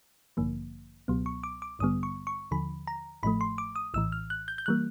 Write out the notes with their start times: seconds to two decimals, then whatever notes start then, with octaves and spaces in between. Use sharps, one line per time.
0.37 A1 G2 D3 F3 A#3
1.08 C#2 B2 F#3 B3
1.26 C#6
1.43 D6
1.62 D6
1.79 A1 G2 D3 G3 B3 D#6
2.03 C#6
2.27 C#6
2.51 D#2 D3 F3 B5
2.87 A#5
3.23 A1 A2 F3 A3 B5
3.41 C6
3.58 D6
3.76 D#6
3.94 A#1 A2 E3 E6
4.12 F6
4.30 F#6
4.48 G6
4.58 G6
4.66 E3 G3 A#3 F#6